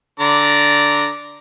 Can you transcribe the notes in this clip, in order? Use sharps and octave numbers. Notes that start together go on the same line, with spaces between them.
D3 D5 A#5